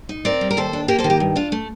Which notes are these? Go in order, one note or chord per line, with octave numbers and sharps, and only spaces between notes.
D#4
C4 A#4 D5
G3
A#4
D#2 A4 C5
D4
A#3 G4 A#4
A4 C5
D#3
G4
G2
D4 F4
A3